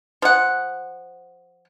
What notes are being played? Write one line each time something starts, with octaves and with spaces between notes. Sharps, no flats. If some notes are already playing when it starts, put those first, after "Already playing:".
F3 F#5